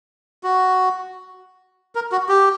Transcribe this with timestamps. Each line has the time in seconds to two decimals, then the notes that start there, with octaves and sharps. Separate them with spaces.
0.43 F#4
1.95 A#4
2.12 F#4
2.29 G4